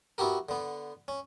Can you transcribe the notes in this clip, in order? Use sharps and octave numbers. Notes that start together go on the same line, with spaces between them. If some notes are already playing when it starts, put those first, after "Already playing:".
B3 E4 F#4 G4 A#4
D3 B3
C#4